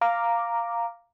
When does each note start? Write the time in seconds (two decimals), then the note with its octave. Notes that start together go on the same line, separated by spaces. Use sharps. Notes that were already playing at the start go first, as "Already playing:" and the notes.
0.01 F5 A#5 D6